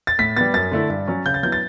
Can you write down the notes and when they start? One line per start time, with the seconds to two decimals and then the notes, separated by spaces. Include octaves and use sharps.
0.07 A6
0.19 A2 B6
0.36 G3 B3 A6
0.54 F#2 A6
0.72 D3 A3 E4
0.90 G2
1.07 F#3 C#4
1.25 C#3 G6
1.34 A6
1.43 F#3 B3 E4 G6
1.52 A6